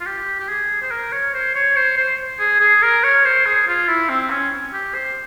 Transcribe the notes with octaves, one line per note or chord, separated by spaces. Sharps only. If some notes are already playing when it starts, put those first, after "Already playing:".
F4
G4
G4
G#4
C5
A#4
C#5
C5
C#5
C5
C5
G#4
G#4
A#4
C#5
C5
G#4
F4
E4
C4
C#4
G4
C5